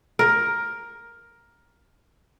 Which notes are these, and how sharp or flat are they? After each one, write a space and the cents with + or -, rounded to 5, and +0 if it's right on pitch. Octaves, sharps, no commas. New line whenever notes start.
A#4 +10